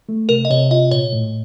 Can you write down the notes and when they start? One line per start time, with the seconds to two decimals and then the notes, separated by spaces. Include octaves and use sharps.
0.09 A3
0.29 C3 A#4
0.45 D#5
0.50 C3 C#5
0.71 F4 D#5
0.91 A#2 C#5
1.13 A2